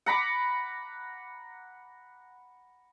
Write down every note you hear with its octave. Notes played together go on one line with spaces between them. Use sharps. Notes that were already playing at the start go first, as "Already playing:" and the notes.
F#5 A#5 B5 D6